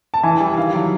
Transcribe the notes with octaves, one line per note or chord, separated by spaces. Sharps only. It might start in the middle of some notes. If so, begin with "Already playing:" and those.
A5
E3 G#5
G3
D#3 F5
F#3